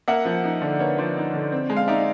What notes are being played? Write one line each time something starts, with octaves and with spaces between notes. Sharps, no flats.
A#3 E5 F#5
F3
D#4
D3
A#3 B4 C#5
F3 C5 D5
D#4
D3
C4
G#3
F5
D#4 D5 E5